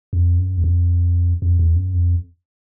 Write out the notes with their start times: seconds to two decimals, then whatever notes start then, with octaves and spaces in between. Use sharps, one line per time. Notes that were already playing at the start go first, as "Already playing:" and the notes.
0.13 F2
0.38 F#2
0.57 E2
0.64 F2
1.42 F2
1.59 E2
1.76 F#2
1.94 F2